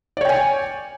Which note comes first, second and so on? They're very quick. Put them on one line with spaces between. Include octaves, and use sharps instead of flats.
D5 C#5 G5 G#5